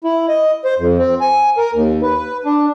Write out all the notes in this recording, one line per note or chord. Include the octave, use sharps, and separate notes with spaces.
E4
D#5
C5
F2
C4
G#5
A#4
D#2
B4
D4